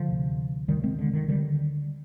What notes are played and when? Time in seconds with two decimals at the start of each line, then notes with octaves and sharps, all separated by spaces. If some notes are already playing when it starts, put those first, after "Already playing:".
Already playing: D3 F3
0.08 D2 C3
0.68 D2 C3 D#3 G3
0.83 G#3 C4
0.99 D3
1.13 D#3
1.28 D3 D#3 G3